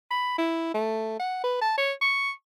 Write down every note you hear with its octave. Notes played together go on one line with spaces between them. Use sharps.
B5
E4
A3
F#5
B4
A5
C#5
C#6